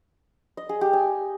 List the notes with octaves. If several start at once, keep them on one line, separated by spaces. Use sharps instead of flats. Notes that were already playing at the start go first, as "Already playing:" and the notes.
D#5
G#4
G4
G#5